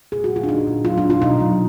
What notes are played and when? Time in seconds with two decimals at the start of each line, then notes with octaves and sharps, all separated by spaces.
0.12 A#2 G#4
0.24 F#4
0.30 A#2
0.36 F4
0.44 D4
0.49 A#2 D#4
0.67 A#2
0.85 F#3 F4
0.98 D4
1.04 F#3
1.10 F4
1.22 B2 D#4
1.40 F#3